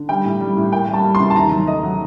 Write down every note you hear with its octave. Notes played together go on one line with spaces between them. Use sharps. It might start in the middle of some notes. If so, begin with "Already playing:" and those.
Already playing: D3
G3 G5
A2
G3
A2
A#3 G5
G3 A5
G3
C6
C3
A5
D#2 A#5
F#3
A3 D#5
F#3